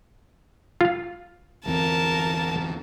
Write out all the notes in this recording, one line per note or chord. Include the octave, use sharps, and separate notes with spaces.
F4 F5
G1 E2 C4 A#4 A5